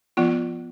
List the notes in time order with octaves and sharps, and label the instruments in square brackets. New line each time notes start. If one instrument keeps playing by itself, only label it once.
[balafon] F3 B3 F4